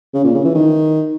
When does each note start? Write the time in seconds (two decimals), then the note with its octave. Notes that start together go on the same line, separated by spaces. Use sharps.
0.14 C#3
0.24 A#2
0.35 C#3
0.45 E3
0.55 D#3